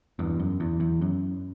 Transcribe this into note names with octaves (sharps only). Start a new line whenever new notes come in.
E2 G2
F#2
E2
E2
F#2